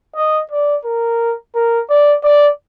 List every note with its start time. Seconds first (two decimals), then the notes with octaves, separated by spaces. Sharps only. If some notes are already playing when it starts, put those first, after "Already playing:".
0.16 D#5
0.51 D5
0.85 A#4
1.55 A#4
1.90 D5
2.24 D5